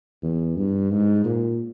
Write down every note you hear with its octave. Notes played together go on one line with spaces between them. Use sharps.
E2
G2
G#2
A#2